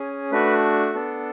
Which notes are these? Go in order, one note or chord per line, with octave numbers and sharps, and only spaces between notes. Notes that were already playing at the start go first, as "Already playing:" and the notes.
Already playing: C#4 G#4
A3 D4 F#4 B4
B3 D4 A4